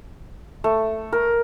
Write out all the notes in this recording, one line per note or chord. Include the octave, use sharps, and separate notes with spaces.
A3
A#4